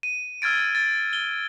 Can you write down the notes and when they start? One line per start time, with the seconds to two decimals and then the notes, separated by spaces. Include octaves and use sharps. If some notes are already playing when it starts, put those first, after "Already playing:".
0.03 D#7
0.42 E6 F6 G#6 A6 D7
0.75 A6
1.13 G7